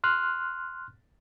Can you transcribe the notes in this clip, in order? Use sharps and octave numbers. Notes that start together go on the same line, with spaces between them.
C6 F6 F#6